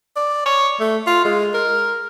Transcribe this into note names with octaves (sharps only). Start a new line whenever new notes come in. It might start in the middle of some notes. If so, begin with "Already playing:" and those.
D5
C#5
A3
F4
G#3
A#4